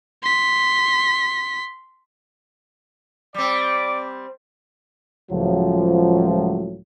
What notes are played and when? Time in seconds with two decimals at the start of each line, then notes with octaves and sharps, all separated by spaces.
0.22 C6 B6
3.34 G3 C4 D5 D6
5.31 C#2 A2 F3 F#3